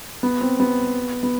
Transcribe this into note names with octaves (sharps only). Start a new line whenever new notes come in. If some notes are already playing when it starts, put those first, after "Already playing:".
B3
C4
B3
B3